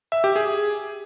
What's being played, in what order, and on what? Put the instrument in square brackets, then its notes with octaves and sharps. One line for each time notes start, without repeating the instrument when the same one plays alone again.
[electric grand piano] E5
G4
G#4